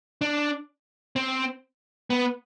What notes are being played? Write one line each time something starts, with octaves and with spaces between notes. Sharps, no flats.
D4
C4
B3